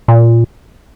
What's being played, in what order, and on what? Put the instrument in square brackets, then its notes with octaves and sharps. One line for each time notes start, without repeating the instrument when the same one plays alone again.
[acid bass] A#2